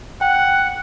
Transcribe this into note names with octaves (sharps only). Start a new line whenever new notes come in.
F#5 G5